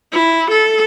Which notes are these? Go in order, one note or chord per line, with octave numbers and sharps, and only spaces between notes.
E4
A4